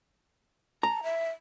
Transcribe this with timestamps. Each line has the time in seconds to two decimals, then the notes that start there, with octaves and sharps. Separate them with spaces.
0.83 A5 A#5
1.03 E5